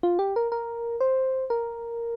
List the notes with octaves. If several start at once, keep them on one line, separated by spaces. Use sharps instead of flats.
F4
G4
A#4
A#4
C5
A#4